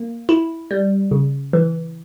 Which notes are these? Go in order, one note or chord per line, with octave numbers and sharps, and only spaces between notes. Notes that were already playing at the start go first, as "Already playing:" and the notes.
Already playing: A#3
E4
G3
C#3
E3